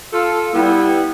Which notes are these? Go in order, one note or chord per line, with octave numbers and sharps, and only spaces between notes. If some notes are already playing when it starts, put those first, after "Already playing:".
F4 A4
G3 B3 E4